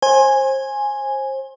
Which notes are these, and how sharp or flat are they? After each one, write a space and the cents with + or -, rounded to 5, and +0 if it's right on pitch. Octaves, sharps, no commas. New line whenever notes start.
C5 +30 G#5 -5